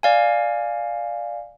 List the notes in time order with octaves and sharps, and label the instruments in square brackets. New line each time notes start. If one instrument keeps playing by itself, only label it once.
[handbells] D5 F5 G#5